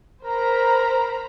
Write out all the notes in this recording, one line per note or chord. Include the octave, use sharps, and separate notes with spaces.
A#4 C5 A#5 B5